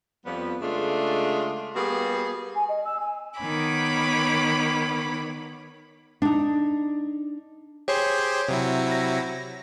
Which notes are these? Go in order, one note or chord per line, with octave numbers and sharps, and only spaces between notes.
F2 F3 G3 B3
C#3 G#3 A3 D4 F4
G3 A#3 B3 F#4 G#4
G#5
D#5
E6
G#5
D#3 B3 C#5 B5 D6
D4 D#4
G4 G#4 C5 C#5
C3 F#3 E4
A#6